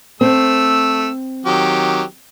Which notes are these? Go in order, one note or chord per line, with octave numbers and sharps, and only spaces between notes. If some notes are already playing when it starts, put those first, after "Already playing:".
A3 C4 E6
D#3 F#3 G4